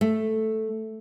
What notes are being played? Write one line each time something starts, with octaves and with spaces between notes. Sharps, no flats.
A3